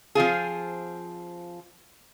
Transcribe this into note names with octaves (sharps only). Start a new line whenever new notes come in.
F3 C4 F4 G#4